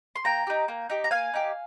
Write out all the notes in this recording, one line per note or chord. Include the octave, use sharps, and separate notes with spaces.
C6
A#3 G5 A#5
D#4 G4
A#3
D#4 G4
A#5
A#3 F5 G#5
D#4 G4